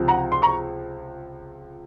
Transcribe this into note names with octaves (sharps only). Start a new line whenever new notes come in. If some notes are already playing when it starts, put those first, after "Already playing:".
Already playing: C#2 C3 F3
F#5 A#5
C6
A#5 C#6